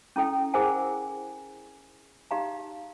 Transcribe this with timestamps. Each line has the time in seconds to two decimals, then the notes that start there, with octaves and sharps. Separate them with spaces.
0.16 C#4 E4 A4 G5
0.54 E4 G#4 A#4 C5 F#5 G#5
2.31 D#4 G4 F5 A#5